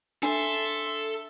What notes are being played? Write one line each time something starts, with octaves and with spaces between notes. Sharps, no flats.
D4 A4 E5 C6